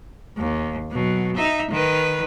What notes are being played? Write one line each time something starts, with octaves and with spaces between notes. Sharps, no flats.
D#2
B2 F#3
D#4 E5
D#3 B4